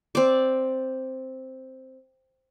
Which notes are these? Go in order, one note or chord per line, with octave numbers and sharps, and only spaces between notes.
C4 D5